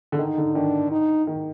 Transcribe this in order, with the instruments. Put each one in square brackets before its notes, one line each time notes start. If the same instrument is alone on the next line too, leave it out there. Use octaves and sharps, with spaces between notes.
[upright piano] D3
[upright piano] D#3 [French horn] D#4
[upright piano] D3
[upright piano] D#3 [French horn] D4
[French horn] D#4
[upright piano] D#3